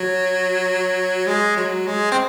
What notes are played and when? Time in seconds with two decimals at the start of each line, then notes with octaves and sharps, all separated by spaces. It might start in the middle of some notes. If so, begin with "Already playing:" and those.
Already playing: F#3
1.27 G#3
1.57 F#3
1.87 G#3
2.12 C4